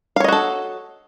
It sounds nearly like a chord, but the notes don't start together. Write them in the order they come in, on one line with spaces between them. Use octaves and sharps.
F5 C#5 D#5 F#4 A4